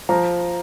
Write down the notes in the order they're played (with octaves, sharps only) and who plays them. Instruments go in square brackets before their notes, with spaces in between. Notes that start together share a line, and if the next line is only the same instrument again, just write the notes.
[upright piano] F3 A#5